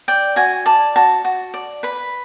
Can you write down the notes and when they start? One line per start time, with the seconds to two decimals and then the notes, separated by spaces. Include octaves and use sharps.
0.08 D5 G5
0.36 F#4 G#5
0.66 D5 A5
0.96 F#4 A5
1.25 F#4
1.54 D5
1.83 B4 B5